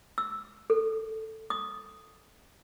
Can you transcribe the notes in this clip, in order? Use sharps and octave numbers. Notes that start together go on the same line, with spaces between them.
E6
A4
D#6